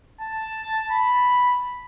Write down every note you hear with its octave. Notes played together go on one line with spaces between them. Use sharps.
A5
B5